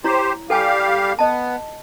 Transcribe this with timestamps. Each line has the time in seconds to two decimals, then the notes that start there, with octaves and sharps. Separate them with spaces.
0.04 E4 G4 C5 C#5
0.50 G3 G4 A4 F5 G5 G#5
1.19 B3 D#5 A5